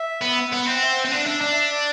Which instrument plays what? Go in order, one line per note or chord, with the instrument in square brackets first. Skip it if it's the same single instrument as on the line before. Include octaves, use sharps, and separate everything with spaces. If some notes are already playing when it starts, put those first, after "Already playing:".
Already playing: [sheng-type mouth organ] E5
[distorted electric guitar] B3
[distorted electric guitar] B3 [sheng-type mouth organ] F#5
[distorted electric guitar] C4
[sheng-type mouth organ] F#5
E5
F#5
[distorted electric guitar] C4
[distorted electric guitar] D4 [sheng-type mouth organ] F#5
[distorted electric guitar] D4 [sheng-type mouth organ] E5
[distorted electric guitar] D4 [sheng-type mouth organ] D5
[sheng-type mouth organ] E5
D5